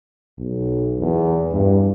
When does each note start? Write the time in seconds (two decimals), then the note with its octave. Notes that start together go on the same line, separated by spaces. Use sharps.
0.38 B1
0.99 E2
1.51 G2